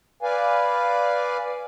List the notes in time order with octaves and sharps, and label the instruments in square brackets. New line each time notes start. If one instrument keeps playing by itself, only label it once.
[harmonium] B4 D5 F5 G#5